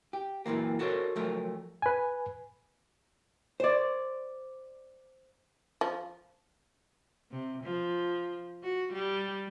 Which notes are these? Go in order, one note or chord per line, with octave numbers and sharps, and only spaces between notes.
G4
F#2 A#2 E3 A#3
F#4 A4 A#4 C5 C#5
F3 F#3 A3 A#4
B4 G#5
C5 D5
F3
C3
F3
F#4
G3